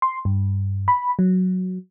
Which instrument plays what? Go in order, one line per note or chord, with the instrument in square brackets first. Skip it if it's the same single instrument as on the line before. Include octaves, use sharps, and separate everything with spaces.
[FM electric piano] C6
G2
B5
F#3